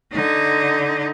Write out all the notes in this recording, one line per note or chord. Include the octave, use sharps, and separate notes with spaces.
D3 D#4